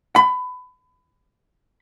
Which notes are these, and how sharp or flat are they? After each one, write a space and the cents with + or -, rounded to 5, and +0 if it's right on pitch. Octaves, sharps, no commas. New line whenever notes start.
B5 +25